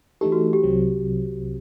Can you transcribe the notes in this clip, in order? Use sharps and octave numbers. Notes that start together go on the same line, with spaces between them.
E3 A3 D#4 G4 A4
F#4
G4
C2 C3 F#3 C4